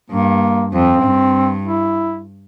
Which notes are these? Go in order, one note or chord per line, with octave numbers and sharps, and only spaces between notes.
G2 A#3
F2 C4
G2
E4